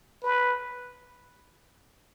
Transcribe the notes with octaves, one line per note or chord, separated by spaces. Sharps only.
B4